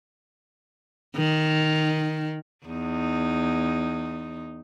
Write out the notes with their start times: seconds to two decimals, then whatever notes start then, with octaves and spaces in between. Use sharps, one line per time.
1.17 D#3
2.66 E2 D#4